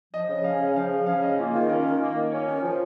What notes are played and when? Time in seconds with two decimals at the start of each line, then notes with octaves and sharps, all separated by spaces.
0.14 F3 D#5
0.29 C#3
0.44 C#4 F5
0.60 C#3
0.76 F3 F5
0.91 C#3
1.06 C#4 F5
1.22 C#3 D#5
1.38 A#3 F4
1.53 D#3 F4
1.69 C#4 A#4
1.85 D#3
2.00 A#3
2.16 D#3
2.32 C#4 C#5
2.46 D#3
2.62 F3